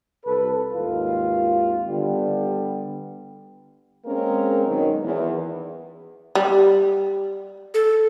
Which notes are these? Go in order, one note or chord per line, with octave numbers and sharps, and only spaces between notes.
C2 A4 B4
G#1 D#2 F4
D3 G3 B3 G4
G#3 A#3 C4 C#4 G#4 A#4
G#2 B2 D#3 F#3
E2
G3
A4